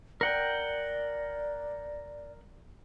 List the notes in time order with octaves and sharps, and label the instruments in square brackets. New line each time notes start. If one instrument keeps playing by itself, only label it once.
[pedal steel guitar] A#4 F#5 G5 [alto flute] D5